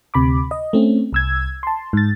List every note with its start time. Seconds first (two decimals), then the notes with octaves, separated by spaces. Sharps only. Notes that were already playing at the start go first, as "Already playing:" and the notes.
0.14 D2 C3 B5 D6
0.51 D#5
0.73 A3 C4 C#4
1.13 C2 E6 G#6
1.63 A5 C6
1.93 G#2 A6